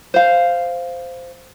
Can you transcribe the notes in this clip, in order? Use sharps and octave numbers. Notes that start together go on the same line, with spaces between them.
C5 F5